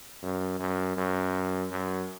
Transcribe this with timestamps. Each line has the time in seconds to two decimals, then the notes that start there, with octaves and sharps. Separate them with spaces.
0.22 F#2
0.59 F#2
0.97 F#2
1.71 F#2